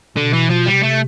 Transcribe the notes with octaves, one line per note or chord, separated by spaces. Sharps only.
B2 D3
E3
F3
C3 G3
A3